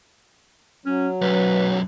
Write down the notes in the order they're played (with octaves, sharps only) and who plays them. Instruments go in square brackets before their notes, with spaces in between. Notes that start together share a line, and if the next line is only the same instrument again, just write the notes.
[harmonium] F#3 [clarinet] C#4
[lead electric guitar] B1 F#2 [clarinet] B4